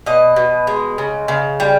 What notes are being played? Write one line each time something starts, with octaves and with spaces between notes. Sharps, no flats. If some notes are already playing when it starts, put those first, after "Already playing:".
B2 D#5
B2
G#3
C#3
C#3
G3